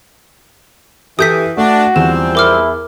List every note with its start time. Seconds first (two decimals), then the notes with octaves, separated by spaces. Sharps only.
1.19 E3 G4 A4 D#6 G6 B6
1.57 A3 D4 F#4
1.96 E2 F3 G3 C4 E7
2.35 E4 A#4 D6 F6